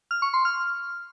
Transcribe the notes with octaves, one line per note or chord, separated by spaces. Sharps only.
F6
C#6
C6
F6